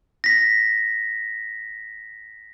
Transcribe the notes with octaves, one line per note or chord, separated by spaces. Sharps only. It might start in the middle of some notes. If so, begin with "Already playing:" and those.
A#6 B6